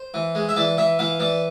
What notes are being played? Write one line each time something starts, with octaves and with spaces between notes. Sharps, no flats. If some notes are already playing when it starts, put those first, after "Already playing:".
Already playing: C5
E3
G#3
E5
E3 D5
E3 E5
E3 F5
E3 D5